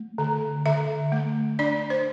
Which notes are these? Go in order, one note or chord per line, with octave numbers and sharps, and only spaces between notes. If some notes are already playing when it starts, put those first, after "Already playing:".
Already playing: A3
D3
D3 E5
A3
D4 D5
C5